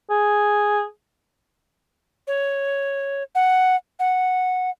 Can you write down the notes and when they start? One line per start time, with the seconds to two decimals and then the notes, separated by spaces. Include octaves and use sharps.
0.10 G#4
2.27 C#5
3.35 F#5
3.99 F#5